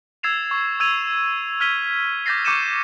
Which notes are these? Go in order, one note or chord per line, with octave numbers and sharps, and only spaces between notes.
E6 G#6 A6 C7 E7 F7
C#6
E6 G#6 D#7 F7
F6 G#6 B6 D#7 G7
D6 G6 A6 A#6 C7
C#6 D6 G6 C#7 D#7 E7